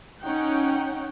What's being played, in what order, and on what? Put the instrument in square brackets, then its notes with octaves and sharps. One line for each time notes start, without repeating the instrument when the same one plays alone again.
[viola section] C#4 D#4 C#5 F#5 G5